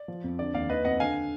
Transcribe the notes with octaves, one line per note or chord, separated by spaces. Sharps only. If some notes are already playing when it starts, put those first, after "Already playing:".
Already playing: D5
F3
F2
D3 D5
D#2 D5 F5
D#3 B4 D#5
F2 D#5 F#5
D3 F5 G#5